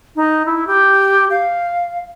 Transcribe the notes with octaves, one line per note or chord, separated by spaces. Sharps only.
D#4
E4
G4
F5